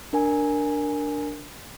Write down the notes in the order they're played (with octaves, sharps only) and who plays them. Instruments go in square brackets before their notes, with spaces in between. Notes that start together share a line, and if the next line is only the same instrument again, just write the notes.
[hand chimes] D4 A#4 G#5